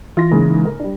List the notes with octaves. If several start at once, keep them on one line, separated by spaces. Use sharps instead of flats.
E3 F4 A#6
G#2 C#3 A#3
A#4
G3 D4